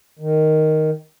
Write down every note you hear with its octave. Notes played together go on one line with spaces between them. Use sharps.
D#3